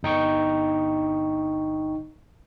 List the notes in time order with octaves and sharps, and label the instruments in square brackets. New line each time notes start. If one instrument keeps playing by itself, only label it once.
[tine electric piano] G1 D#4 G5 C#6